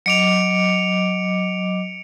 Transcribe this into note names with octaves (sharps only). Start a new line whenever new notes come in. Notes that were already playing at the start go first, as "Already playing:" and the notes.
F#3 D#5 D6 C#7 D7 F7